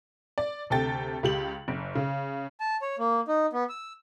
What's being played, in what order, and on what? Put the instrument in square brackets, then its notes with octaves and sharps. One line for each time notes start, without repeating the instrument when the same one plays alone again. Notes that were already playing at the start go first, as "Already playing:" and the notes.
[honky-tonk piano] D5
D2 C3 A4 G5 A6
C#2 G4 F#7
F#1
C#3
[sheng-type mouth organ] A5
C#5
A#3
D#4
B3
E6